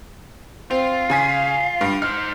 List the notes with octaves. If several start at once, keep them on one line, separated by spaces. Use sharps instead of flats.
C4 F4
C#3 G#5 B6
G2
D#4 C5 F6